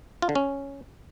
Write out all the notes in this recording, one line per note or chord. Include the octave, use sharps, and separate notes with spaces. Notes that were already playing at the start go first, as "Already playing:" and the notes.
F4
D3
C#4